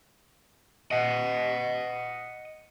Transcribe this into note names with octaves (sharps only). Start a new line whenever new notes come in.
D#5 F#5